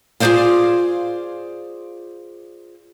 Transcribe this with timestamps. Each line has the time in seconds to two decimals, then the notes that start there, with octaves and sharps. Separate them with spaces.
0.20 F4 G#4 A4 C5 D5 F5